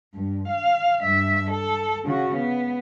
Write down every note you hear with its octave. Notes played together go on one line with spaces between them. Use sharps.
G2
F5
G2 E5
A4
C#3 F#4
B3